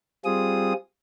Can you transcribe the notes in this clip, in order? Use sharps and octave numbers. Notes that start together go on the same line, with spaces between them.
G3 C4 F4 G#4 D#6